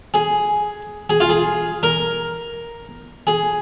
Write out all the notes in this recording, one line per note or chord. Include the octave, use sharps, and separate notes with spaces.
G#4
G#4
F4
G#4
A#4
G#4